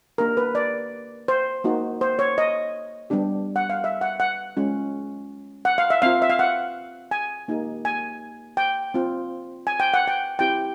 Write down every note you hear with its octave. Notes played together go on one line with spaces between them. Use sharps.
A#3 D4 G4 A#4
B4
D5
C5
A#3 D#4 F#4
C5
C#5
D#5
G3 B3 D4 G4
F#5
F5
E5
F#5
F#5
G#3 C#4 F4
F#5
F5
E5
C4 F4 F5
E5
F5
F#5
G#5
A#3 D#4 G4
G#5
G5
C4 F4
G#5
G5
F#5
G5
C4 E4 G4 G5